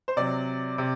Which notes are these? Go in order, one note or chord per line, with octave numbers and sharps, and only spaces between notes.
C5
C3 F#3 D5
C3